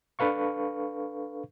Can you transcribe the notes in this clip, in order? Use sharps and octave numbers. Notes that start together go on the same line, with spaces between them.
D4 A4 B4 F5 C#6